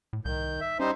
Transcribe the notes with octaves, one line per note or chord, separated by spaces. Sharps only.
A2
C2 D#3 G6
E5
G3 C#4 D#4 C5